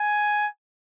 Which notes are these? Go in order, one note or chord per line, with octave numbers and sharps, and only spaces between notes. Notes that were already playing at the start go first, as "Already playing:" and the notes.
Already playing: G#5